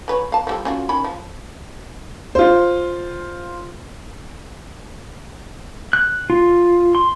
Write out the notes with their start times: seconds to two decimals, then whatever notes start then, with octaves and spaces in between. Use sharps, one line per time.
0.08 E3 B4 C#5
0.32 F5 A5
0.47 F3 G3 A4
0.65 C#4 F4 F#4
0.89 D#3 C#4 B5
1.04 F3
2.35 F4 C5
5.93 F#6
6.30 F4
6.95 C6